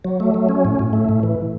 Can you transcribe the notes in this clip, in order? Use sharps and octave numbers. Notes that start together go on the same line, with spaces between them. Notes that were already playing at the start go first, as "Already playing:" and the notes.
F#3
A3
F#3
C#4
A2
A2
A3
A2
E3